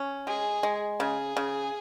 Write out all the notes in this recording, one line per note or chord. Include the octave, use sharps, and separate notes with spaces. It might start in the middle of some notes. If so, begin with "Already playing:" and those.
Already playing: C#4
G#3 G#4
G#3
C#3 G#4
C#3